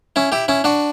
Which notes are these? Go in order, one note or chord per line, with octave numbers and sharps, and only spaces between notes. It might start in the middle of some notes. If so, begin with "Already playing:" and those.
C#4 E4
E4 G4
C#4 E4
D4 F#4